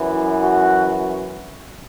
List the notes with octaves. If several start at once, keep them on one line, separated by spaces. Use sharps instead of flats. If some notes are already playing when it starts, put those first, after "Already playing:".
Already playing: F#2 E3
F#4